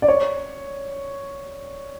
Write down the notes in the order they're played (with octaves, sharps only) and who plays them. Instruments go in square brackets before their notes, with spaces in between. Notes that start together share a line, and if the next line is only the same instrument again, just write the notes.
[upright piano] D5
C#5